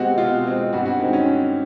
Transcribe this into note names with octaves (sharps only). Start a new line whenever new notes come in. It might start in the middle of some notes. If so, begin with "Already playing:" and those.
Already playing: B2 G#3 C4 F#4 G4
B2 F4
G#3 C4
G2 F#4
F#4
D#3 G#3 C4
C#4